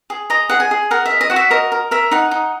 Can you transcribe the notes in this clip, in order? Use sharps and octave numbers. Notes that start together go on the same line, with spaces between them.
G#4
D#5 A#5
G#4 F#5
G#5
G#4
A#4 F#5
D#5 E5
D#5
F#4 F#5
E5
A#4 D#5
A#4
A#4 E5
D#4 F#5
D#4